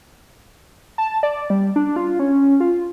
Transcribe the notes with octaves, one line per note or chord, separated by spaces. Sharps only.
A5
D5
G3
D4
F4
C#4
F4